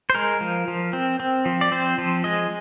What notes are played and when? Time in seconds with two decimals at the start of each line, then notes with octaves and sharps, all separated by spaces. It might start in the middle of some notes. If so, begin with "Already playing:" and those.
0.10 C5
0.15 G#3 A#4
0.41 F3
0.68 F3
0.93 C4
1.20 C4
1.45 F3
1.61 D5
1.72 C4 C5
1.98 F3
2.24 G#3 D#5